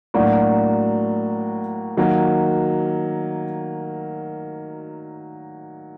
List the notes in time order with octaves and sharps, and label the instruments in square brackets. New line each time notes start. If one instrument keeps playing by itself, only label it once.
[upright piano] A2 F#3 A#3 D4 F#4
D#3 F#3 A#3